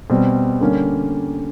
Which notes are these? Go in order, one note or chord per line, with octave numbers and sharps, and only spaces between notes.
B2 G3 C4
D3 G3 A#3 C#4